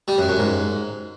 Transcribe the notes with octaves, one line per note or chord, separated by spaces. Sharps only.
G3
F#2
F#2
G#2